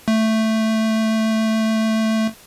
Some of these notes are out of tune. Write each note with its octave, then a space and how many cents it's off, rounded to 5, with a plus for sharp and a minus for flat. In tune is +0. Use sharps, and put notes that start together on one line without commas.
A3 +5